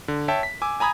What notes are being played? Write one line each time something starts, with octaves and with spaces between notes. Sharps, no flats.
D3
C#5 E5 G5 A5
B6
G#5 D6 E6
G#5 A#5 B5 D#6 G#6